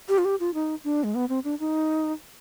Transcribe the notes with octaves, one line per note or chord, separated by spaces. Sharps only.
G4
F4
G4
F4
D#4
D4
G#3
B3
C4
D4
D#4